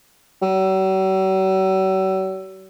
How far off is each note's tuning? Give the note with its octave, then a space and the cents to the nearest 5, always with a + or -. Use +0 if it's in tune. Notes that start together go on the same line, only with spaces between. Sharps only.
F#3 +45